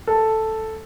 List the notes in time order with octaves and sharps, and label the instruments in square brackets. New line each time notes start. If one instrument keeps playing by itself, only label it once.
[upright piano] A4